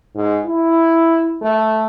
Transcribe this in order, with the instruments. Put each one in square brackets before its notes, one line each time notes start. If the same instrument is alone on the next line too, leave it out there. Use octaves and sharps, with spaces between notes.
[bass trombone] G#2
E4
A3